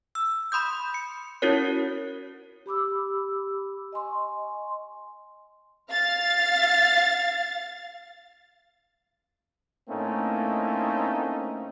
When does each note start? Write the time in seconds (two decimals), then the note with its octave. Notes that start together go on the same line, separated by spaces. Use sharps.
0.15 E6
0.52 B5 C6 D#6 G6
0.94 C#7
1.42 C#4 E4 F#4 A#4 C#5
2.66 G4 B5 D6 E6
3.92 D#5 G#5 C6 C#6
5.90 F5 A6
9.89 A2 A3 A#3 C4 C#4 D#4